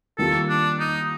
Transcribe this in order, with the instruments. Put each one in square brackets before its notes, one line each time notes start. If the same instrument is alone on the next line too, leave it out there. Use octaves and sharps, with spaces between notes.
[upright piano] D#3 G3 A#3 F4 [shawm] A4
[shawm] D4
D#4